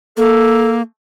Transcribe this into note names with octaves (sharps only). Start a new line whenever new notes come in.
A#3 A4